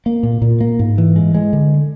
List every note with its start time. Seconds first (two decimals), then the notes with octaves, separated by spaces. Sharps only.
0.06 A#3
0.23 A#2
0.42 A#2
0.61 A#3
0.79 G#2
0.98 E3
1.16 G#3
1.34 G#3
1.53 D3